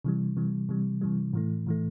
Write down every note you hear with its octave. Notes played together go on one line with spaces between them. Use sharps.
C3 E3 G3
C3 E3 G3
C3 E3 G3
C3 E3 G3
A2 E3 A3
A2 E3 A3